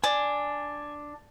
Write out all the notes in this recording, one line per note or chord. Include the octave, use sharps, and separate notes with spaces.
D4 G#5